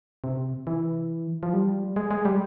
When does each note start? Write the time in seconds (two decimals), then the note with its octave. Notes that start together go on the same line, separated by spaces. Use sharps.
0.24 C3
0.67 E3
1.43 F3
1.54 G3
1.96 G#3
2.11 G#3
2.25 G3